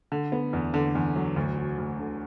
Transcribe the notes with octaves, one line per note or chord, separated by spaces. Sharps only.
D3
B3
E2
D3
E2
F#3
D2
F#4
D2
D3